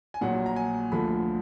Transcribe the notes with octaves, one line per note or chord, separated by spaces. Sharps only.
G#5
A#1 A#2 F#3 F#5
A#5
G#5
D2 D3 F3 B5